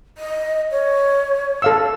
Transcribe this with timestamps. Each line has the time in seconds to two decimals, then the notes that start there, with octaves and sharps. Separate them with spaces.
0.18 D#5
0.71 C#5
1.62 A4 F5 E6